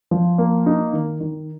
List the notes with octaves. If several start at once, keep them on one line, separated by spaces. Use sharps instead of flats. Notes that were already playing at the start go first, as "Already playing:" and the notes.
F3
A#3
D#4
D#3
D#3